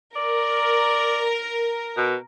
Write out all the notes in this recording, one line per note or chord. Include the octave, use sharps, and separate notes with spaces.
A#4 D5
B2